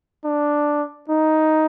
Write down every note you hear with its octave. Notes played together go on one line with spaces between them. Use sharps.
D4
D#4